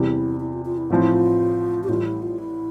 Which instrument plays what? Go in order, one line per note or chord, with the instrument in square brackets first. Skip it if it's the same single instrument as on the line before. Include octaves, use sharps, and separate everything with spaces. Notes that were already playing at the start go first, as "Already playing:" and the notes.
Already playing: [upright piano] E2 C3 G3 [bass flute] E4
[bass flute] E4
F4
F4
E4
[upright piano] A1 A2 F3 C4 [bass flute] F4
[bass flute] E4
F4
G4
[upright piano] A1 A2 G3 [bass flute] F4
[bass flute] E4
F4
E4